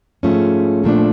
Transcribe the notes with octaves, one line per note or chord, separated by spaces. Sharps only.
G#2 F3 A3 C#4
A#2 F3 A3 D4